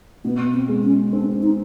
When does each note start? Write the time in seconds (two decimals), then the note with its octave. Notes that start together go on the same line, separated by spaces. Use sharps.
0.24 B2 B3
0.54 C4
0.68 G#3
0.84 C#4
1.13 C4 D4
1.42 D#4